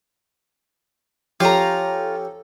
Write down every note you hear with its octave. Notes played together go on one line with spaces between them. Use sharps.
F3 C#4 F4 G4 A4 A#5